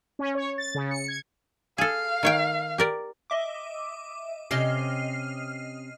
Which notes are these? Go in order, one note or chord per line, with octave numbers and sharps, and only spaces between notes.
C#4
C#5
A6
C#3
C#7
G#6
G#4 A4 F5
D#3 C#5 G5
G4 A#4 D5
D#5 E5 D6
C3 C#4 G4 D#5 F6 C7